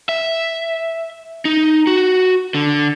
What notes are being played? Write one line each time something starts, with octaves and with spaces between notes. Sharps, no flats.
E5
D#4
F#4
D3